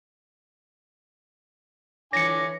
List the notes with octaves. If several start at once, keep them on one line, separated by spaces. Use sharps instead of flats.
D3 E3 C#5 G#5 D6 A#6 C#7